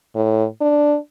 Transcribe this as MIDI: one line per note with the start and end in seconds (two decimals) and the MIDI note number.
0.16 0.45 45
0.61 0.96 62